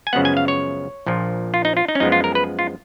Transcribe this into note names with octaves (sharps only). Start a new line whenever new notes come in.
G#5
F#2 C#3 F3 G#3 B3 F#5
G#5
F5
C#5
A#1 A#2 F3
F4
D#4
F4
D#4
C#4
F#2 F3 G#3 B3 D#4
F4
A#4
B4
F4